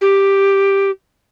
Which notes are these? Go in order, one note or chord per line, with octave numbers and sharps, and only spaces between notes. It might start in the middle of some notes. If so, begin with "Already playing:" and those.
G4